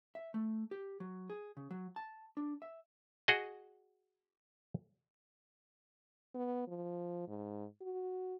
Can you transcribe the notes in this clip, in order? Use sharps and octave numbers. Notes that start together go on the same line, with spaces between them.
E5
A3
G4
F#3
G#4
C#3
F#3
A5
D4
E5
F#4 G#4 D#5
B3
F3
G#2
F#4